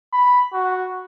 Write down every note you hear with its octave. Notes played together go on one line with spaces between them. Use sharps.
B5
F#4